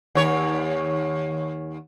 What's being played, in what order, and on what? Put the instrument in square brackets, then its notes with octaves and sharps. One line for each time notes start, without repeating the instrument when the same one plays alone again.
[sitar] D#2 C#5